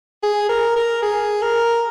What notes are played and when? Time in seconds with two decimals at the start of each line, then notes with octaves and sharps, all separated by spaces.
0.23 G#4
0.49 A#4
0.76 A#4
1.02 G#4
1.42 A#4